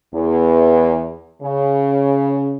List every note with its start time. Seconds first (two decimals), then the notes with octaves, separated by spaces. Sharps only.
0.14 E2
1.42 C#3